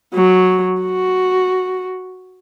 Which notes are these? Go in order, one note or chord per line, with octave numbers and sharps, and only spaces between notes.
F#3
F#4